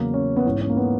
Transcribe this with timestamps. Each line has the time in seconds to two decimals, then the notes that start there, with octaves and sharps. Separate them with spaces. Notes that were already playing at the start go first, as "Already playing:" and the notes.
Already playing: E2 C#3 F#3 A#3
0.14 C#4
0.36 B3
0.45 G#2 E3 C#4
0.61 C#4
0.70 A#3
0.77 B3